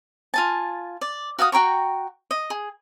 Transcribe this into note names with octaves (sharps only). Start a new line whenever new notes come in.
F4 G#5 A5
D5
F#4 F5 G5 D#6
F#4 G5 A#5 C#6
D#5
G#4